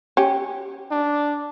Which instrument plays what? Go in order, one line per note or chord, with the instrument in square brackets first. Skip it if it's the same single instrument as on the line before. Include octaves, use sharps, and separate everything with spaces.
[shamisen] C#4 G4
[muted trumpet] D4